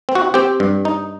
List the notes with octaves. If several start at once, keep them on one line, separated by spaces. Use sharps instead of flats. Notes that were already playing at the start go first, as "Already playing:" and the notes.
C4
F#4
C4 G4
G2
D#4